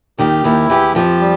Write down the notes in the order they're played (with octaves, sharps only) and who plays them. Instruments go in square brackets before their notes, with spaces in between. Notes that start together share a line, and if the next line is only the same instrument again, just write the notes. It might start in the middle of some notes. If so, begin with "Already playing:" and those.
[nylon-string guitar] D#2 D#3 [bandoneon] G4
[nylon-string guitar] D#2 D#3 [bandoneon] E4
[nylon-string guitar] E2 E3 [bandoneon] G4
[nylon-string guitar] F2 F3 [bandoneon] G4
[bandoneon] G3